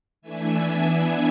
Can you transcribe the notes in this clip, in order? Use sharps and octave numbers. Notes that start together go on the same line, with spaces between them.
E3 A3 D4 E5 G#5
E3 B3 D4